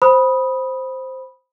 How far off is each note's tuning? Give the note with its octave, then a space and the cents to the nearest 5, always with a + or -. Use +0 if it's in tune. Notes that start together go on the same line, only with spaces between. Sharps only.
C5 +0 B5 -10 D#6 +5